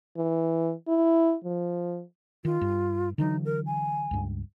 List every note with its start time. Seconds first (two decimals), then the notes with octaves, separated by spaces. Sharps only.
0.17 E3
0.88 E4
1.44 F3
2.45 D#3 F4
2.61 G2
3.18 D3 E3 F#3 D#4
3.45 A#4
3.66 G#5
4.11 C#2 G2